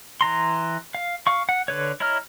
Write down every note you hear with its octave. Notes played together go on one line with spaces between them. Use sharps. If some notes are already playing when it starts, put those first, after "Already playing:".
E3 A#5 C6
F5
F5 C#6
F#5
D3 B4 C#5
E4 C#5 D#5 A#5 F6